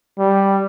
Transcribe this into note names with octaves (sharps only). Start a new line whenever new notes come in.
G3